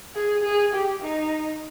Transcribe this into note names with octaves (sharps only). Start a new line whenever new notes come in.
G#4
G#4
G4
D#4